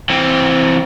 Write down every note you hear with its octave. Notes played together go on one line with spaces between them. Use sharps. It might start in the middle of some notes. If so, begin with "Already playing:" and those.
E3 C4